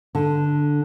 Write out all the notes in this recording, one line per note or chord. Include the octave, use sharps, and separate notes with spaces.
D3